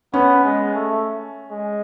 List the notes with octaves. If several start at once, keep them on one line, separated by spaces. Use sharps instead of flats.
B3 C#4
G#3
A3
G#3